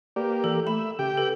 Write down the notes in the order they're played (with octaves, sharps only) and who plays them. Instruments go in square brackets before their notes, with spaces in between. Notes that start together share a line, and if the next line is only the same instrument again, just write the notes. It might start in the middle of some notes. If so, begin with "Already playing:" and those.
[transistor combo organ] A#3 G4 [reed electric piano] B4 D5
[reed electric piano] E3 [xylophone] A4
[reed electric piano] A3 [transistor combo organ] E5 [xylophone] B5
[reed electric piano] C#3 [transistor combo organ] G4 G5
[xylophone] A4 [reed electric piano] B4